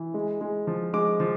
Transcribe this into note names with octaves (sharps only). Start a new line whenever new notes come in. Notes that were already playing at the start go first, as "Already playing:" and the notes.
Already playing: E3
G#3
G#3
F3
G#3 D6
F3